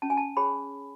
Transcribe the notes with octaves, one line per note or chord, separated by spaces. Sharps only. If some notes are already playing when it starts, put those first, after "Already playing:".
C#4 A5
G#5
A5
G#4 C#5 B5